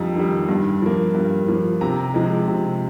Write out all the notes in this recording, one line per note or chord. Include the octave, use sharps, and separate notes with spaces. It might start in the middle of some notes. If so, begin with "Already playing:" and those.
Already playing: F2 D#3 G3 A#5
D#3 G3
G2
F3 A#3
G2
F3 A#3
C3 A#5
F3 G#3
C3